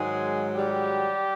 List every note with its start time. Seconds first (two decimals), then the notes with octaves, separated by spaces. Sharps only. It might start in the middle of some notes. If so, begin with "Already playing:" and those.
Already playing: G#2 D#3 F#3 G#3 G#4
0.55 G3 G4